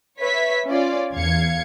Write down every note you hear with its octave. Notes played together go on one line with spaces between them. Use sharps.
B4 C#5 E5 B6
C#4 F4 D5
E2 F5 G#6 C#7